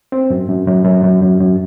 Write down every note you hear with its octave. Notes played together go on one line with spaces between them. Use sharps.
C4
F#2
F#2
F#2
F#2
F#2
F#2
F#2